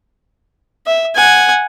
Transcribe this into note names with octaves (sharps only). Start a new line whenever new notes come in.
E5
F#5 G#5